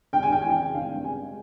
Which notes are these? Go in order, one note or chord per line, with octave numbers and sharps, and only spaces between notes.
G#1 G5
G#5
G#1 G5
E3 G#5
G5
C#3
G#1 F5
G2
C#3 G#5
G#3